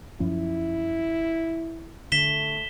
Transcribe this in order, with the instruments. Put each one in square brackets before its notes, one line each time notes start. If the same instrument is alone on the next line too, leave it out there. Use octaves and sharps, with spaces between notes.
[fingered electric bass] F#2 F3 C#4 [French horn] E4
[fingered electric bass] D3 [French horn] A3 [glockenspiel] B6 E7 G7